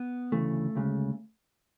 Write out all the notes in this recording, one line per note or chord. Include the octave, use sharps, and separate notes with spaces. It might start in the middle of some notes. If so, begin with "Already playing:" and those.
Already playing: B3
D2 C#3 E3 A3
D2 C#3 E3 G#3